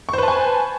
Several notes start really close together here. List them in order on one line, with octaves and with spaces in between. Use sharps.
C#6 C5 B4 A5 G#5